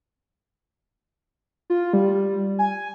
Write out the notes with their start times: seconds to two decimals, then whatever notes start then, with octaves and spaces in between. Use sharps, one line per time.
1.70 F4
1.93 G3
2.59 G#5